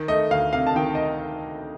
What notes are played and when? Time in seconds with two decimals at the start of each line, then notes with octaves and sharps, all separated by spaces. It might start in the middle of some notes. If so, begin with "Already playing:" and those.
Already playing: D#3
0.08 A3 D#5
0.31 D2 F5
0.53 C3 F5
0.67 A5
0.76 D#3 G5
0.95 D#5